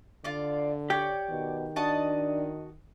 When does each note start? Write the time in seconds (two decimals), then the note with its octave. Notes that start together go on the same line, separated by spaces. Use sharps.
0.24 D3 F4 D5
0.90 G4 C#5 D5
1.30 B2 D#3
1.76 D4 F#4 D#5 A5